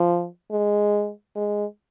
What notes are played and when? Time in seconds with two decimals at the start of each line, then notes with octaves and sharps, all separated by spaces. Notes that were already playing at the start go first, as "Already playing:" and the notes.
Already playing: F3
0.51 G#3
1.36 G#3